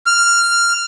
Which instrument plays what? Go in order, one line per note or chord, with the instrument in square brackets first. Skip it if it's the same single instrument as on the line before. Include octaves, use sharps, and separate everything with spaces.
[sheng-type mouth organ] F6